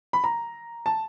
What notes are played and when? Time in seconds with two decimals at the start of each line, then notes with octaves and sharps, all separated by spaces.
0.13 B5
0.24 A#5
0.86 A5